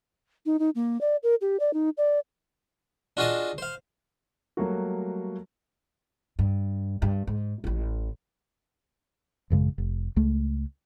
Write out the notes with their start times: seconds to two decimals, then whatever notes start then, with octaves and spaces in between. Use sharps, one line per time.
0.46 D#4
0.59 D#4
0.75 A#3
1.01 D5
1.23 A#4
1.41 G4
1.60 D5
1.74 D#4
1.97 D5
3.17 D4 F4 F#4 G#4 D#5 A5
3.58 C5 F5
4.57 F#3 G3 A3 A#3 F#4
6.39 G2
7.02 G2
7.27 G#2
7.64 A1 E4
9.50 A1 F#2 C#3 G#3
9.78 F1
10.16 C#2 A3